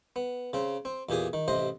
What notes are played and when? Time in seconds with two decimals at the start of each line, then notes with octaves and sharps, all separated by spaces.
0.16 B3
0.53 C#3 C4
0.85 C4
1.09 E2 A#2 G4 G#4 D#6
1.33 D#3
1.48 A1 C3 C5 D#5